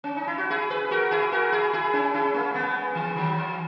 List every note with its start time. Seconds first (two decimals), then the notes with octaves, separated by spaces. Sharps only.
0.04 C#4
0.16 D#4
0.27 E4
0.38 F#4
0.50 E4 G#4
0.70 G#4 B4
0.91 F#4 A#4
1.11 E4 G#4
1.32 F#4 A#4
1.52 E4 G#4
1.73 E4 G#4
1.93 C#4 E4
2.14 C#4 E4
2.34 A#3 C#4
2.54 G#3 B3
2.95 E3
3.16 D#3 F#3
3.37 E3